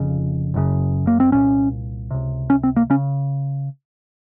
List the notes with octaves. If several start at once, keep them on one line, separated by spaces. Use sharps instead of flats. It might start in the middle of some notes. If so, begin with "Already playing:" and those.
Already playing: F1 F2 C#3
F#1 F#2 C#3
A#3
C4
C2 A#2 C#4
C#2 C3
C#4
C4
A#3
C#3 C#4